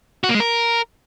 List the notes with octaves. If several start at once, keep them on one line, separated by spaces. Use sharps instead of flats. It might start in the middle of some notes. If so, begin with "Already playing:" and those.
F#4
A#3
G#3
A#4